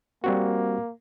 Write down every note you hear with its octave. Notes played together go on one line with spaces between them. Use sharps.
G3 A#3 C4 F#4